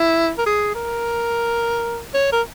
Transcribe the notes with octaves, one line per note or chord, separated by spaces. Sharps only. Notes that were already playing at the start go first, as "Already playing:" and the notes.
Already playing: E4
A#4
G#4
A#4
C#5
A#4